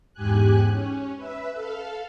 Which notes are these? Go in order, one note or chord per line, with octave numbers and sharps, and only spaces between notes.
E2 G#2 G4 G#5 F#6
C#4
B4 E5
A4 F5